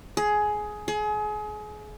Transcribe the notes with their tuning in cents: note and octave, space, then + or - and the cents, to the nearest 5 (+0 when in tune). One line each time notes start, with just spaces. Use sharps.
G#4 +15
G#4 +30